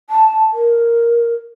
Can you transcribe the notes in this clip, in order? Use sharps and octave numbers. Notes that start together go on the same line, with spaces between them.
A5
A#4